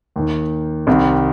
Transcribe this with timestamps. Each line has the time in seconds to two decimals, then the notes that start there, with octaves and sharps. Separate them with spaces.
0.16 D#2 D#3
0.87 C2 C3 D#3